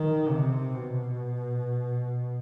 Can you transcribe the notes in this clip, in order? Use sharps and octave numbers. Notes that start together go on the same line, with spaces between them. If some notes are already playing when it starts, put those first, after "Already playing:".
Already playing: D#3
C3
B2